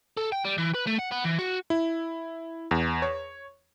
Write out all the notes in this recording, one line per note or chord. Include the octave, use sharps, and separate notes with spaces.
A4
G5
G3
E3
B4
A3
F#5
B3
E3
F#4
E4
E2
C#5